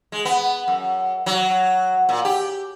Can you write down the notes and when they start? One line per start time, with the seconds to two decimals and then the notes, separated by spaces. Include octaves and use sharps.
0.12 G#3
0.25 B3
0.68 F#2
1.26 F#3
2.09 A#2
2.25 G4